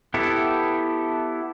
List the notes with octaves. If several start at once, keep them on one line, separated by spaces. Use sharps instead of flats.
B3 E4 G4 A4